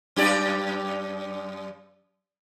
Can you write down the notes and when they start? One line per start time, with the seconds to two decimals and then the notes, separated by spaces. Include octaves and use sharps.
0.16 F#2 G4 D5